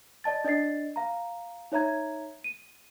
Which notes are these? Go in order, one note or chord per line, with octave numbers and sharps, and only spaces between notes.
D5 D#5 A5 A6
D4 D5 D#5 A6 C7
F5 A#5
D#4 C#5 E5 A#5 G#6
D#7